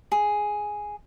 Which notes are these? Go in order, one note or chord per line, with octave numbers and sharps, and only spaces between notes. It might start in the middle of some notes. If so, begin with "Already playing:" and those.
G#4